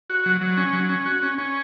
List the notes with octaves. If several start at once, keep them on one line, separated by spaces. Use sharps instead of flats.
F#4
F#3
F#3
C#4
F#3
C#4
F#4
C#4
C#4